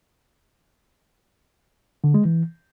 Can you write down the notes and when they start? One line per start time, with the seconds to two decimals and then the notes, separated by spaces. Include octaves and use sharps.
2.04 D3
2.14 G#3
2.25 E3